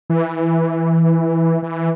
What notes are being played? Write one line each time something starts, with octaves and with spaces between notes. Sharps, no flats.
E3
E3